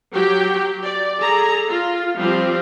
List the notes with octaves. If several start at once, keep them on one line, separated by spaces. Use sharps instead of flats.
F#3 G4 G5
D5
G#4 A4 A#5
F4
F3 G3 C4 F4 G4